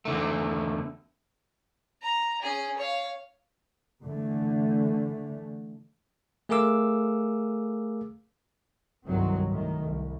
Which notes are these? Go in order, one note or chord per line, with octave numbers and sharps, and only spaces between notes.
E2 D3 A3
A#5
C#4 G#4
C#5 F5
D3 E3 A3
A3 G#4 A#4 F5 D6 E6
G1 C2 D#3 F#3 C4
A2 D#3
C2